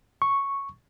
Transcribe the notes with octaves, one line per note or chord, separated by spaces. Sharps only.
C#6